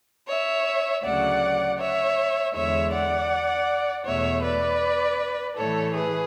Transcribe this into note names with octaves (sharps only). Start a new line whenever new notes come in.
C#5 E5
D2 C#3 F#3 D5 F#5
C#5 E5
E2 D3 G#3 C#5 E5
D5 F#5
E2 B2 A3 C#5 E5
B4 D5
A2 E3 A3 A4 C#5
G#4 B4